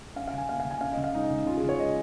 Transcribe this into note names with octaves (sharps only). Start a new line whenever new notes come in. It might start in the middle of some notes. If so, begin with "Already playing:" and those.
C#4 F5
F5
C#3 G#5
A#3 F5
C#3 F5
G#5
C#4 F5
C#3 D#5
F5
G#3 D#4
C#3
C#4 F4
G#4
C#3
C#5
G#3 D#5